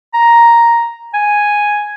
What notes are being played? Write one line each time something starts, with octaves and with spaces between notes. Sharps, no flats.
A#5
G#5